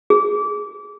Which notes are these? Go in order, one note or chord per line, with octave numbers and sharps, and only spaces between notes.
G#4